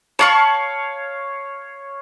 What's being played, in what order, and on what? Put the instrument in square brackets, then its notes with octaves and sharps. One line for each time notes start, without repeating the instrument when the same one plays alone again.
[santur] C#5 F5 [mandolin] A5 B5 C#6